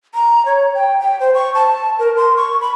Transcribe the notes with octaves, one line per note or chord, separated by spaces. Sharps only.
A#5
C#5
G5
G5
C5
C#6
A5
A#4
C6
C#6
B5